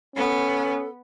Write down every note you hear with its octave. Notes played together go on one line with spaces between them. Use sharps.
B3 C#4 A4